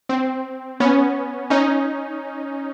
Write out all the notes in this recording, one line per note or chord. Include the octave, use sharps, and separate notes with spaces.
C4
B3 C#4
C#4 D#4